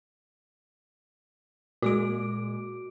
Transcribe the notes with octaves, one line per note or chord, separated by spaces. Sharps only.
A#2 G#3 F#4 D6 D7